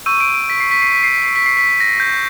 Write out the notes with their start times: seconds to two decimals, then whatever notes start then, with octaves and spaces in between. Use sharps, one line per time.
0.06 C#6 E6 G6 D#7
0.20 D7
0.35 D7
0.50 B6
0.60 C7
0.71 B6
0.82 C7
0.93 B6
1.03 C7
1.14 B6
1.25 C7
1.36 B6
1.46 C7
1.57 B6
1.80 A#6
2.00 G6